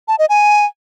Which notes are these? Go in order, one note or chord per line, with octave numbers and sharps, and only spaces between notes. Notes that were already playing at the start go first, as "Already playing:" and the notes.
A5
D#5
G#5